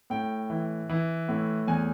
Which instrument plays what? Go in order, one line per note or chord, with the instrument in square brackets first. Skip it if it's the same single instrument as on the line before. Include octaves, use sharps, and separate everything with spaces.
[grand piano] A2 G5
E3
E3
A2
E2 G#5